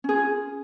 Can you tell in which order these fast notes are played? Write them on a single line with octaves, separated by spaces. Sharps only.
C#4 G#4 F4